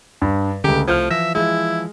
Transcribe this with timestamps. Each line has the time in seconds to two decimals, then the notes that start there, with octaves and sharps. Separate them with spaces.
0.22 G2
0.64 C#2 D3 A3 C#4 G4 A#5
0.88 C2 F3 A3 F6 G6 G#6
1.10 E3 F3 E5 A#6
1.35 E3 F3 G#3 E4